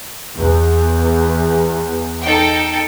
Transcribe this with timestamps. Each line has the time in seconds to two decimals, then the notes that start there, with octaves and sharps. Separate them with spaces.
0.38 E2
2.22 D#4 A4 G5